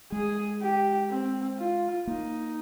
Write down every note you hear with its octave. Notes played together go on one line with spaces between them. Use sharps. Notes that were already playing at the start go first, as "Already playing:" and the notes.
G#3 G#4
G4
C4
F4
A#3 D#4